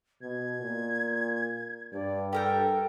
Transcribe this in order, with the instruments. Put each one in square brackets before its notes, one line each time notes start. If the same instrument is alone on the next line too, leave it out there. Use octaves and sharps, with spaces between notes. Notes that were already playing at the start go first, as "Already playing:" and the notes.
[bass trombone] B2 [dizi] G#6
[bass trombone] A#2
[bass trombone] G2 [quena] D5
[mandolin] G4 A#4 G5 [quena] A4